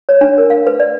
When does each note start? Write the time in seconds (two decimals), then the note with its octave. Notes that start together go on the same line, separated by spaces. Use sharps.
0.09 C#5
0.21 D4
0.38 A#4
0.50 F5
0.67 B4
0.80 D5